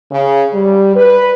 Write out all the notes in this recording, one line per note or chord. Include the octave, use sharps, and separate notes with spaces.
C#3
G3
B4